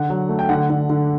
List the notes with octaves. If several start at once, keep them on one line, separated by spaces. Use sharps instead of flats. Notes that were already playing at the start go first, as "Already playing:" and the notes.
Already playing: D3 F#5
F#3
A3
G5
D3 F#5
D3
D3